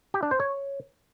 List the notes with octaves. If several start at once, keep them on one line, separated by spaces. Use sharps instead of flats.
G4
D4
C5
C#5